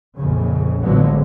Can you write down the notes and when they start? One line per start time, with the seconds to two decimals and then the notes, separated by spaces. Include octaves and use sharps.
0.17 A#1 F2 C#3
0.82 A1 D3 F3 F#3 G#3 B3